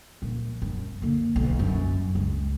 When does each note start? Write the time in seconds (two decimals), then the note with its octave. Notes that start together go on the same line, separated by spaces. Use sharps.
0.22 A#2 F3
0.62 F#2
1.02 D3 A#3
1.36 B1
1.59 F#2
2.15 C#2